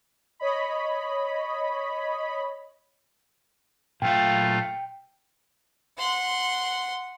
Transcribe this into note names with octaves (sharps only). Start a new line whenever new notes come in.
C#5 D#5 B5
A#2 F#3 A3 F4 F5 G5
F#5 C6